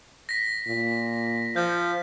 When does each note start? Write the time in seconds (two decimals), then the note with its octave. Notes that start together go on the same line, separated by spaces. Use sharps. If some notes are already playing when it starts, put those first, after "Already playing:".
0.29 A#6 B6
0.68 A#2
1.56 F3 G6